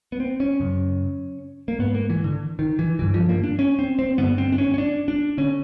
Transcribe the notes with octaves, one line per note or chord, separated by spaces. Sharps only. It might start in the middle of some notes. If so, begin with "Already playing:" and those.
B3
C4
C#4
F#2 C#3
A#3
G#2 B3
A#3
E3
D3
D#3
E3
G2 D3 E3
F3
A#3
D4
C#4
C4
C4
G2 D3 B3
C4
D4
C#4
C#4
D4
D4
D3 C#4